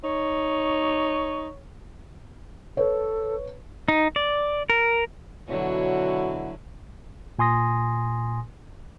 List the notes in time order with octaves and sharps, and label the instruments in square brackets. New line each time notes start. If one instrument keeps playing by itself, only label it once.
[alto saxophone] D#4 [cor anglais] C#5
[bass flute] A4 [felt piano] B4 C#5
[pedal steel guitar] D#4
D5
A#4
[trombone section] B2 E4 F#4 [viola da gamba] D3 F#3 [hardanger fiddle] C#5
[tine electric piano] A#2 G#5 C6 D#6 A#6